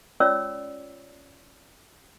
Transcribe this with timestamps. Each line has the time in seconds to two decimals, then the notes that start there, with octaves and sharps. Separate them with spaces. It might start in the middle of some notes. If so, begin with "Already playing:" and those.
0.20 C#4 F4 C#5 D5 E6